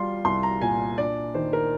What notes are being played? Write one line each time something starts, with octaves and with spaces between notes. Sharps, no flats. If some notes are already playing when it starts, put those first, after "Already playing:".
Already playing: G3 F4 C6
C2 C6
A#5
A#2 G#5
D4 D5
D#3 C5
A#4